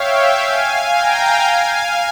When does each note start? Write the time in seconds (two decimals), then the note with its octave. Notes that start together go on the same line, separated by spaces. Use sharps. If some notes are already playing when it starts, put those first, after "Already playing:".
Already playing: C#5 E5 F5 G5
0.44 F5 G#5
0.95 G5 A#5
1.46 F5 G#5